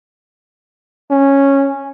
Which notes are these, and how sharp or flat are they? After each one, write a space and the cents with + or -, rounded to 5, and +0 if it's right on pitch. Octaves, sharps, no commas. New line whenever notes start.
C#4 -10